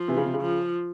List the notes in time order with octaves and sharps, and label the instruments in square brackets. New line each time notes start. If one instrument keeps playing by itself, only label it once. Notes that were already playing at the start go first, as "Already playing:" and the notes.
Already playing: [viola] F3
[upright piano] C3 E3
C#3
C3
C#3
[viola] F3